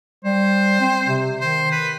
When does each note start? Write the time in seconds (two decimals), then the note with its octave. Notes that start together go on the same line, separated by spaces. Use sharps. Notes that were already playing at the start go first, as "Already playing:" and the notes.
0.25 G3 C5
0.81 C4
1.07 C3
1.40 D#3 C5
1.71 B4